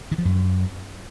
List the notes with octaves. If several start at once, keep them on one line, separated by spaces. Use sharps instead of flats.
D#3
F3
F#2